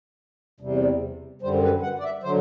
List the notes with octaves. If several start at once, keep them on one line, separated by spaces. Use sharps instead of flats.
E2 C3 G3
F#2 D3 G3 C5
B4
F#5
D5
E5
D3 F#3 C5